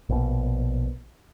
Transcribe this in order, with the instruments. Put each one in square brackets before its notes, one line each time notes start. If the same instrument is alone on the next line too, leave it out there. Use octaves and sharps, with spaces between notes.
[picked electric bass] A#1 B2